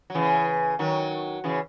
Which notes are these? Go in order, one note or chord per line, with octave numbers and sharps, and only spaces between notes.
F#3
C#3 E3
D#3 F#3
C#3 E3